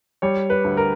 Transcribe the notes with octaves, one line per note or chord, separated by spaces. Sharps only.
G3 C#5
B4
D2
A#4